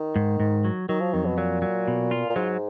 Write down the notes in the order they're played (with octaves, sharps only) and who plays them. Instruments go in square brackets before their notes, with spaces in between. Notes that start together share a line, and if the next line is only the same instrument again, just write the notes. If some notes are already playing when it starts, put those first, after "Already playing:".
Already playing: [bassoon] D#3
[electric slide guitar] G#2
G#2
F#3
[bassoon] D#3 [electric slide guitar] F#3
[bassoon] F3
[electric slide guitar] F2 [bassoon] D#3
[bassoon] B2
[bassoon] A#2 [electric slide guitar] F#3
[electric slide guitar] F#3
B2
F4
[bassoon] A#2
[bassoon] G#2 [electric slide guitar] F#3